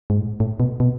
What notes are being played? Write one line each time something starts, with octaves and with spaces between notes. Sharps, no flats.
G#2
A2
A2
B2
B2